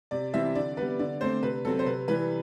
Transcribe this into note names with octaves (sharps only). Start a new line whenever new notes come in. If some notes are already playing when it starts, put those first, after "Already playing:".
C3 D5
E3 G3 C4 E5
D3 D5
G3 B3 B4
D3 D5
A3 C4 C5
C3 B4
F#3 C4 A4
C5
C3 B4
E3 G3 B4